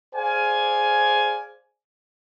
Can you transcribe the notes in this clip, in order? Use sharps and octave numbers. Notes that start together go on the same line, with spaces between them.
G#4 C5 D5 F5 G#5